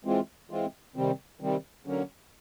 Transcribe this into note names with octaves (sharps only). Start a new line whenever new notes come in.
E3 G#3 C4 F4
E3 G#3 C4 F4
C3 D#3 G3 C4
C3 D#3 G3 C4
D3 F#3 A#3 C#4